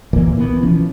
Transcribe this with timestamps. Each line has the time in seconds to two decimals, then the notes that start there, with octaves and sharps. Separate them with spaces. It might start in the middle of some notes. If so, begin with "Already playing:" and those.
0.13 D2 A#2 E3 A#3
0.36 C2 E3 F3 B3
0.62 B2 E3 F3 C#4